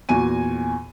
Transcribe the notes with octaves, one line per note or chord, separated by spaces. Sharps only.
E2 A#2 F#4 G#5 D#7